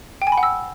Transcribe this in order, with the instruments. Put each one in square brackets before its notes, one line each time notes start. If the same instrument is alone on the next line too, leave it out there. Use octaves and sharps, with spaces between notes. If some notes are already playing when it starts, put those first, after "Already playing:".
[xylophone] G5
G#5
B5
F#5
E6